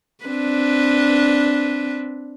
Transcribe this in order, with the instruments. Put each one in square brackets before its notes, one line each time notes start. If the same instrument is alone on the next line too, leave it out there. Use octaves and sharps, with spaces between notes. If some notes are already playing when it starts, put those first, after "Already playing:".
[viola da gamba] C4 D4 B4